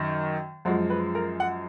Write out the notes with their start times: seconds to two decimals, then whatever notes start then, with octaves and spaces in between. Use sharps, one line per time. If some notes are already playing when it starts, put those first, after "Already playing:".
Already playing: F#2 D#3
0.65 F#2 F3 G#3 F#4
0.90 B4
1.15 A#4
1.40 F#5